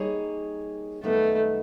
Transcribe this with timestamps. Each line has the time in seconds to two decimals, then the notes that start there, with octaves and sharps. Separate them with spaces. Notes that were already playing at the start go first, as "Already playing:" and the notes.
Already playing: G3 A#3 D#4 G#4 C#5
1.03 F#2 D#3 G3 A3 B3 D#4